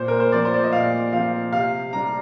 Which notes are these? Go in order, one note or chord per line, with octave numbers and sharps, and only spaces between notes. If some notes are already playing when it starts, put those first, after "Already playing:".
Already playing: A#2 C5
A#4
C5
F3 C4 D5
C5
D5
D#5
A#2 F5
F3 C4 F5
C3 F5
G3 D4 A#5